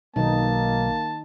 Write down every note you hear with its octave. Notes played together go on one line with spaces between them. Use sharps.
B1 D#3 A#3 D#4 A5